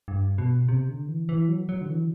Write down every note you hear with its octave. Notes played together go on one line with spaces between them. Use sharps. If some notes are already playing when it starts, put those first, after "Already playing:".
G2
B2
C3
D3
E3
E3
F#3
F#3
D3
E3